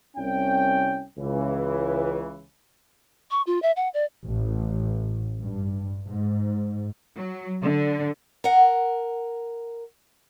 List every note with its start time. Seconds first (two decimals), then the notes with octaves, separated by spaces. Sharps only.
0.17 C2 C#4 G5
1.18 C#2 C#3 E3
3.31 C#6
3.47 F4
3.62 E5
3.76 F#5
3.94 D5
4.27 A1
5.41 G2
6.07 G#2
7.16 F#3
7.62 D3
8.44 A#4 F#5